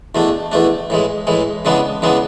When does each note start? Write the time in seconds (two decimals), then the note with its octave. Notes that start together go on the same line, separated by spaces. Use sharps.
0.15 E2 B2 A3 D4
0.52 E2 B2 A3 D4
0.90 A2 E3 G#3
1.27 A2 E3 G#3
1.65 C#3 E3 G#3 B3 D4
2.02 C#3 E3 G#3 B3 D4